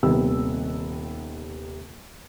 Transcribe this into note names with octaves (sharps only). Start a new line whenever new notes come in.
D#1 C3 D#3 B3 E6